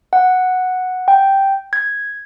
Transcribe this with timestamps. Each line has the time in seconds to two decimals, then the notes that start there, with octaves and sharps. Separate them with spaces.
0.13 F#5
1.08 G5
1.73 G#6